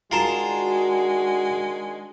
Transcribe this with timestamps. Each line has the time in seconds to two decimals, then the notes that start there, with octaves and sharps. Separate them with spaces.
0.12 D#3 G#3 D4 F4 F#4 A#4 A5